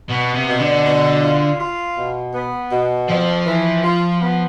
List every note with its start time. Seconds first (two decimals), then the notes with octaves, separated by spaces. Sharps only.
0.10 B2 B3
0.35 C3
0.48 B2
0.60 D3
0.86 B2
1.22 F4
1.60 F4
1.97 B2
2.34 B3
2.72 B2
3.09 F2 F3
3.46 E3
3.84 F4
4.21 B3